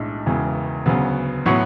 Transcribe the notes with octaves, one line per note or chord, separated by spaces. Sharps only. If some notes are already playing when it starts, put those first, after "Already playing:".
Already playing: B1 A2 G#3 D4
E1 E2 C#3 E3
D2 C#3 F#3 B3
A2 F#3 B3 F#4 C#5